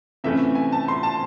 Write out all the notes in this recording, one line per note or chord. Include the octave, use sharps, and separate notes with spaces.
C3 E3 A3 C#4 E5
G#5
A5
C6
A5